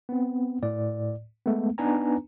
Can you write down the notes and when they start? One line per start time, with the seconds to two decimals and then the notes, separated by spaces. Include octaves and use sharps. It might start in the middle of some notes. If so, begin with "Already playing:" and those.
0.09 B3 C4
0.63 A2 D5
1.46 G#3 A3 B3
1.78 B3 D4 D#4 B4 G#5 A#5